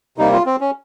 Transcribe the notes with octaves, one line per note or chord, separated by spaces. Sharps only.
C3 G3 A#3 D#4
F4
C4
C#4